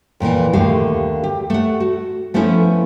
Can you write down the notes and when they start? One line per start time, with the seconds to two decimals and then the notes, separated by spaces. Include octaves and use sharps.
0.20 F2 A#2 D#3 E3
0.53 D#2 D3 A3 G4 F5
1.24 G4
1.50 A3 F#5
1.80 F#4
2.34 F3 A3 B3 C#4 E4 A4